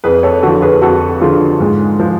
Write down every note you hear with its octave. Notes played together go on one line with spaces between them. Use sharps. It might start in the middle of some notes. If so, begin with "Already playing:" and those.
F2 G#4 B4
A4 C#5
D3 F3 F#4 A4
G#4 B4
F2 F#4 A4
D3 F3 F4 G#4
G#2
F3